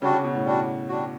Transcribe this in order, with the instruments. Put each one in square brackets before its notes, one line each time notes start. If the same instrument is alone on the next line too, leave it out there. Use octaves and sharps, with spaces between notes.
[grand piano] C#3 [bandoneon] G3 D4 F#4
[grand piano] C#3
B2
A2
[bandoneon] G3 D4 F#4
G3 D4 F#4